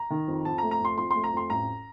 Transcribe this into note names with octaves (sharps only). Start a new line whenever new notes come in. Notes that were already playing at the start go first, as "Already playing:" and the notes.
Already playing: A#5
D#3
F2
F2 A5
A#5
A3
A#5
F2 C6
F2 C6
A3 C6
A#5
F2 C6
A1 A#5